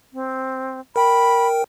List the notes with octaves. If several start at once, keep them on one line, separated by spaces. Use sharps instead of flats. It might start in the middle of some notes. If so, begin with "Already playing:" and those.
C4
A#4 G5 B5